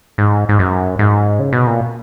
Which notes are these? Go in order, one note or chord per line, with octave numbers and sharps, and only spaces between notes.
G#2
G#2
F#2
G#2
C#3
B2
A#2